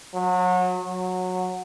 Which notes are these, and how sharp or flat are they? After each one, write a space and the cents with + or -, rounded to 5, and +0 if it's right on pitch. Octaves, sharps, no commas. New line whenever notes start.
F#3 -30
F#3 -15